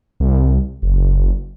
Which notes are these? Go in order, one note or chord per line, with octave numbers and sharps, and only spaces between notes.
C2
F#1